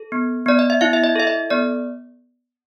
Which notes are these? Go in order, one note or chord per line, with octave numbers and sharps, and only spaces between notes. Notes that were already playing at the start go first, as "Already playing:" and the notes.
Already playing: A4
B3
B3 D5
D#5
E5
E4 F5
E5
D#5
A4 E5
D#5
B3 D5